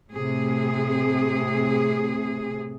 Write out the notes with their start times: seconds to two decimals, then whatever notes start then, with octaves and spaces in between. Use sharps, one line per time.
0.11 A2 C3 G#4